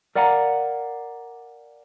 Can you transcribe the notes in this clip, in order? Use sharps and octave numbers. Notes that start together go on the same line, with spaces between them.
A#4 D5 F5 F#5 G#5 A#5